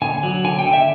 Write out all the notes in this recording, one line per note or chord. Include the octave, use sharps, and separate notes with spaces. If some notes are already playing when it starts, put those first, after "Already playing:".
D3 G#5
F#3
D3 G#5
G5
D3
E5